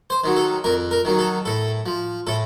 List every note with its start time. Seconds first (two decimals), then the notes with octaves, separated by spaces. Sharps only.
0.10 C5
0.24 D#3 F#3
0.36 A4
0.64 F2 A#4
0.91 A#4
1.05 D#3 F#3
1.19 A4
1.45 A2 A4
1.86 F3
2.27 A2 A4